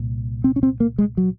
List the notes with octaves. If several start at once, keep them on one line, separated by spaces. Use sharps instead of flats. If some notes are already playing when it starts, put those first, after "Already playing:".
Already playing: C2 A#2
C4
C#4
C4
A#3
G#3
F#3